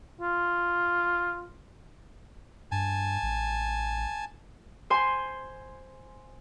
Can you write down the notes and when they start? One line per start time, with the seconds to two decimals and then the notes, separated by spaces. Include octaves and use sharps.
0.21 F4
2.72 G2 G#5 A5
3.23 A1
4.90 C5 G#5 C6